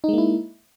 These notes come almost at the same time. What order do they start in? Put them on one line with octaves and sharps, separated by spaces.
D#4 G#3 A#3 E4